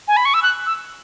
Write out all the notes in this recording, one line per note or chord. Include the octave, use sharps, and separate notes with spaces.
G#5
B5
C#6
E6
F#6
E6